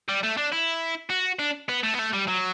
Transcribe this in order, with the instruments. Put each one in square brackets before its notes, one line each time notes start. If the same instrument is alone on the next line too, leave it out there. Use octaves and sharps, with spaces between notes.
[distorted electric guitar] G3
A3
D4
E4
F#4
D4
B3
A3
B3
A3
G3
F#3